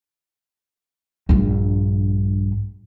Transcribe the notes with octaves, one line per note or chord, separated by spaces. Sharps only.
A#1 G2